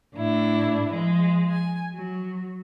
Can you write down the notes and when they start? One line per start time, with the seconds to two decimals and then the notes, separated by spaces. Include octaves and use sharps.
0.15 A2 D4 E4
0.91 F3 G#3
1.50 G#5
1.94 F#3